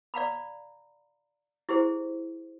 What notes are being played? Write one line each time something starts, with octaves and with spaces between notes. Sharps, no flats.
D5 F5 A#5 B5
E4 G4 G#4 C5